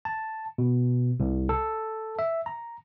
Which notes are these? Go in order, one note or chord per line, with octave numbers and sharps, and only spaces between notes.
A5
B2
C2
A4
E5
A#5